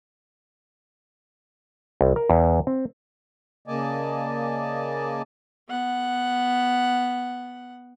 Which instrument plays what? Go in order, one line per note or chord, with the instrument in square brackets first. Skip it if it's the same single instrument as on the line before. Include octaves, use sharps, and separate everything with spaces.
[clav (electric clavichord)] C2
A#4
E2
C4
[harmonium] C#3 A#3 D5 D#5 G#5 A5
[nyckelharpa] B3 F#5